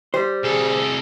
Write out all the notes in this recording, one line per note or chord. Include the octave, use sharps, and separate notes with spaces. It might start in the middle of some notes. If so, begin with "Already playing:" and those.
G3 C5
C2 G#4 A4